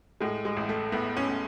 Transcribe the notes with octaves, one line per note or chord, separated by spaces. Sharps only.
A2 G#3
G#3
A1
A3
A2 B3
C#4
A2